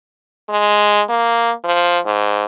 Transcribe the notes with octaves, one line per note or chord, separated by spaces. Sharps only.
G#3
A#3
F3
G#2